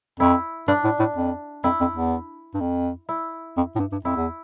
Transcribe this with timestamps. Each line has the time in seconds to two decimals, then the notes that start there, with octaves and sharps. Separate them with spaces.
0.20 F2 E4
0.68 G2 D4
0.84 A2
1.00 A2
1.16 F2
1.64 F2 E4
1.81 F2
1.96 E2
2.54 G2
2.61 F2
3.09 E4
3.57 F2
3.76 A2
3.80 G2
3.92 G2
4.05 F2 E4
4.16 E2